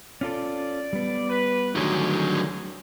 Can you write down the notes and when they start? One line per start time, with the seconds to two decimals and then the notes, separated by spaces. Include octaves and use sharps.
0.21 C#4 F4 A4 D5
0.93 G3 B3
1.29 B4
1.75 D3 D#3 F#3 G3 A3 G#4 C#5 G5